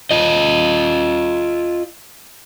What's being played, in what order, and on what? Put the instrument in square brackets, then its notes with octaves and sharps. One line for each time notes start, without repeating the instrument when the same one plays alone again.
[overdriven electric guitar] F4 D#5